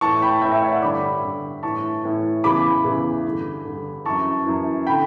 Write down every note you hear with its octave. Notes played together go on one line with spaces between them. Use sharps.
A2 E3 A5 C#6
G5 B5
A2 E3 E5 G5
E5 G5
C#5 E5
D5 F#5
G2 D3 B5 D6
G2 D3
A2 E3 A5 C#6
A2 E3
E2 C#3 E3 B5 D6
E2 C#3 E3
G2 D3
G2 D3
F#2 E3 A5 C#6
F#2 E3
D3 G5 B5